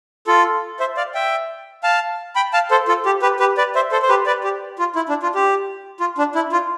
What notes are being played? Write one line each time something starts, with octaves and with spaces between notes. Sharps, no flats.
F4 A4
C5 E5
D5 F5
E5 G5
F5 A5
G5 B5
F5 A5
A4 C5
F4 A4
G4
G4 B4
G4 B4
B4 D5
C5 E5
A4 C5
C5
G4 B4
B4 D5
G4
F4
E4
D4
F4
G4
F4
D4
E4
F4